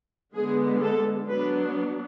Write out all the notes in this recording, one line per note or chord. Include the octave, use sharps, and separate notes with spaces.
D3 G#3 B3 G#4
A4
F#3 B3 D4 B4